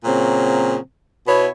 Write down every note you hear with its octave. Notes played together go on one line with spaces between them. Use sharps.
A#2 C#3 F#3 C4
B2 B3 E4 C#5